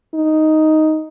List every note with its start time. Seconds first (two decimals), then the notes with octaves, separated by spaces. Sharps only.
0.14 D#4